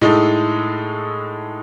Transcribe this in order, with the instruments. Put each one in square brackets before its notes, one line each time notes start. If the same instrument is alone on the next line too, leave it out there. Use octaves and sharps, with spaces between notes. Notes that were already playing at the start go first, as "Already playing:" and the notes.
[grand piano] A2 G#3 D#4 A4